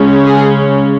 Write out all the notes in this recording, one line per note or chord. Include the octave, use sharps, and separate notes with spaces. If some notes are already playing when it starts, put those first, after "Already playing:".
Already playing: C#3 G#3 C#4
G#4